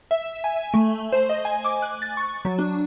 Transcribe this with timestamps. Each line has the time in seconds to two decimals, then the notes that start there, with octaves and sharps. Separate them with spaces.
0.11 E5
0.44 G#5
0.74 A3
1.12 C5
1.29 D#5
1.45 G#5
1.65 D6
1.82 F#6
2.02 A6
2.17 C#6
2.45 F#3
2.59 D4